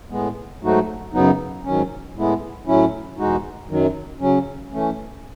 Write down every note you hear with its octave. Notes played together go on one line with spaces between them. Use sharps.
A2 G#3 B3
G#2 F#3 A3 D#4 F#4
F#2 C#3 F#3 B3 D#4
G#2 D#3 F#3 C#4
A2 G#3 B3 E4
A2 F#3 C#4 E4
E2 B2 G#3 D#4 F#4
F#2 D#3 F#3
C#3 F#3 C#4
E3 A3 C#4